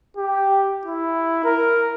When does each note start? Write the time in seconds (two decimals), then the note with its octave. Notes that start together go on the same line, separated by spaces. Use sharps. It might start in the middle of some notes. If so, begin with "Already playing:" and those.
0.17 G4
0.85 E4
1.44 A#4